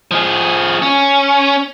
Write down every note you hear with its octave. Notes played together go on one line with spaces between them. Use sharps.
F3 G#4
C#4